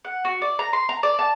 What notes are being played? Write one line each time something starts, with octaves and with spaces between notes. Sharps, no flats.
F#5
F#4
D5
A#5
C6
A#5
D5
A5